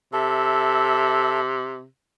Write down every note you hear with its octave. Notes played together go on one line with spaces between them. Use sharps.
C3 A4 E5